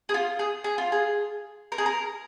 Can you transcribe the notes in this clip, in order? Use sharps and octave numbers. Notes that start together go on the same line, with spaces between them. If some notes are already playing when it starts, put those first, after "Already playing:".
G#4
F4
G#4
G#4
F4
G#4
A#4
G#4
A#4